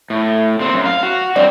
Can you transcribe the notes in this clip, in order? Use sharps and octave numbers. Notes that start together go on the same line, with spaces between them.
A2
A#2 C4
F#2
F5
F#4
G2 C4 D5